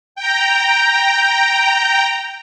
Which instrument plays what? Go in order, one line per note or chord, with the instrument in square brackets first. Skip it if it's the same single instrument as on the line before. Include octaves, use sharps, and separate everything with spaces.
[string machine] G5 A#5